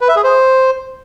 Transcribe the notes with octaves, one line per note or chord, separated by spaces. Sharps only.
B4
E5
G#4
C5